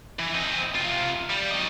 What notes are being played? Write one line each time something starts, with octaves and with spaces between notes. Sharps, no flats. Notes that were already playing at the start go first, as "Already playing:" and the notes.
E3
C4 D#5
C3 F4
G3
F#3 D#5